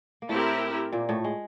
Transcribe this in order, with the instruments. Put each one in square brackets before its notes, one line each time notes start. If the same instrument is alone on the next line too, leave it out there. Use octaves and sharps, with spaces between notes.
[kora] A#3
[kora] A2 A3 [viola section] C4 E4 G4 A#4
[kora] A#2 A#3
A2 A3
G#3